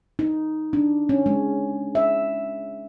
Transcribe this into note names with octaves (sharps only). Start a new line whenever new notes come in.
D#4
D4
C#4
G#3
E5